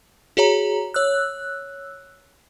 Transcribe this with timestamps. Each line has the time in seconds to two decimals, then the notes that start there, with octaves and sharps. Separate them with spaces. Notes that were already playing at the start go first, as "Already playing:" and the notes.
0.37 F#4 G#4 C#5 A#5
0.94 C#5 E6 F#6